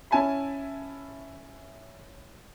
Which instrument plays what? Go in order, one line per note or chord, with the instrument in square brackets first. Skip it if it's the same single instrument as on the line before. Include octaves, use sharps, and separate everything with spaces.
[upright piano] C#4 E4 G#5 A5 B5